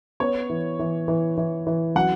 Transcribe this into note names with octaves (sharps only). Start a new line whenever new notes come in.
B3 C#5
E3
E3
E3
E3
E3
F#3 F#5